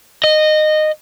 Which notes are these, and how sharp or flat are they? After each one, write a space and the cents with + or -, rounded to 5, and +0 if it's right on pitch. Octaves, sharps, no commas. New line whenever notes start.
D#5 -15